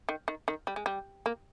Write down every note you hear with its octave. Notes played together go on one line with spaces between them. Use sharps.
D#3
D#3
D#3
G3
G#3
G3
A#3